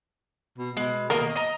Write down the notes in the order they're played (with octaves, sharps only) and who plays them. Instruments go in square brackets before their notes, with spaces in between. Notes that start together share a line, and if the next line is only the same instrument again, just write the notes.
[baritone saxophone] B2
[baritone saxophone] B2 [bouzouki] G#3
[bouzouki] D#3 A#3 D#5 [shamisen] A#4
[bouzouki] D#5 A#5